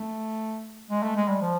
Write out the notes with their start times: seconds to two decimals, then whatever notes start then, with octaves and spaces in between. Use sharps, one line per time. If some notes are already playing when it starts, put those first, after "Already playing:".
Already playing: A3
0.91 G#3
1.03 A3
1.16 G#3
1.28 G3
1.41 F3